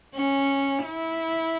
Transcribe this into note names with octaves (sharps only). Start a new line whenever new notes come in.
C#4
E4